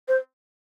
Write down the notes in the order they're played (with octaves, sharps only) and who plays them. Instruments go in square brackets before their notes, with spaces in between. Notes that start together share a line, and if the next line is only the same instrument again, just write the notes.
[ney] C5